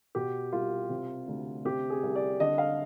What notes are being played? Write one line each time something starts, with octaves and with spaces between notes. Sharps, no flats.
B2 G4
C2 F4
C3
D2
C3 G4
G#4
C2
D5
D3 D#5
F5